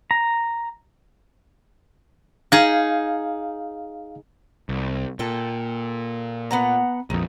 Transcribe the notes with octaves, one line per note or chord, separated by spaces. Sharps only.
A#5
D#4 G#4 F5
C2
A#2 A4 G5
B3 F#5 A#5
A#1 F2 D#4